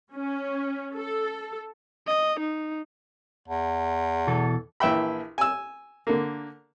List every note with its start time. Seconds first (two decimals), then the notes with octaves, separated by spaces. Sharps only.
0.14 C#4
0.95 A4
2.07 D#5
2.39 D#4
3.48 E2
4.27 B2 E3 A4
4.80 A#1 E3 E5 G5 B5
5.38 G#5 E6
6.07 D3 A#3